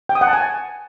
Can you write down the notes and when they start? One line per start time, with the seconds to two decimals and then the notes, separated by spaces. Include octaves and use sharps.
0.09 G5
0.15 D#6
0.21 F#5
0.27 A5
0.33 G#5